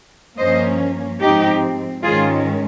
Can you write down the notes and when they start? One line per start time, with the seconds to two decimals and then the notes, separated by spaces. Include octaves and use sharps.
0.38 G2 F3 A#3 C#4 C5 D#5
1.20 G#2 F3 C4 D#4 G4
2.03 G#2 D#3 G#3 C#4 F4 G#4